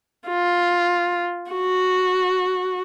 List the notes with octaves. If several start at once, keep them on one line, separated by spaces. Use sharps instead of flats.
F4
F#4